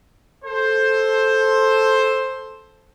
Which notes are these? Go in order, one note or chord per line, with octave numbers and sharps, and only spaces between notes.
A4 C5